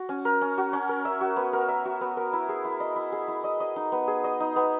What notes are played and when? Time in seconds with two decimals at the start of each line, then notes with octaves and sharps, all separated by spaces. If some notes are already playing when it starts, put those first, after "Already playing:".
Already playing: F#4
0.09 C#4
0.25 A#4
0.41 C#4
0.58 F#4
0.73 C#4
0.89 A#4
1.05 E5
1.21 F#4
1.36 B3
1.53 A#4
1.69 E5
1.85 F#4
2.01 B3
2.17 A#4
2.33 E4
2.49 G#4
2.65 E4
2.80 D#5
2.96 E4
3.12 G#4
3.28 E4
3.44 D#5
3.60 D#5
3.76 D#4
3.92 B3
4.07 G#4
4.24 D#5
4.40 D#4
4.56 B3